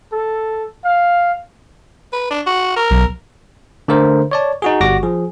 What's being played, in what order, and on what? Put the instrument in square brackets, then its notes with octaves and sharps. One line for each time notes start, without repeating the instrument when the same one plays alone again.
[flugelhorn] A4
F5
[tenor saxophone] B4
D4
F#4
A#4
[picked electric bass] B1 F#3
[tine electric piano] D3 A3 A#4 C5
C#5 D5 A5
D#4 F#4 G#4
G1 G3 F#4 D6 A#6
F3 G#4